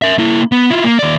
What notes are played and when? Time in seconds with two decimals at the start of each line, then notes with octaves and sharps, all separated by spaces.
0.02 A#4 E5
0.18 A#3 E4
0.52 B3
0.70 E4 F4
0.84 A#3
0.99 D#2 D5